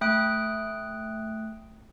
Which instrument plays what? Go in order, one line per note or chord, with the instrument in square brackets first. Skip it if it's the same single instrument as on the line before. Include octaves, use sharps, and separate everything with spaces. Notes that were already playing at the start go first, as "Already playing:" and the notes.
[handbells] A3 G5 D#6 F#6 D7